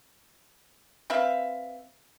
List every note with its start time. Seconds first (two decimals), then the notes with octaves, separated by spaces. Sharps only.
1.10 C4 B4 E5 F5